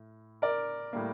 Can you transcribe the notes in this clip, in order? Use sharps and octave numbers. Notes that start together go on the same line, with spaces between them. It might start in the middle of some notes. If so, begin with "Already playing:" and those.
Already playing: A2
A#4 D5
A2 G3 A#3